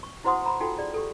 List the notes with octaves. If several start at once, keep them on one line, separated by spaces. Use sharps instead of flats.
C#6
E4 F#4 C5 F#5 C6 D#6
A#5 B5
D#4 F4 F#4 A4 G5
G#4 D5
G4 A4